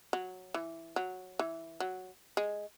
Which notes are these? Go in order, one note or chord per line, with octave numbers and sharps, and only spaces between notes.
F#3
E3
F#3
E3
F#3
G#3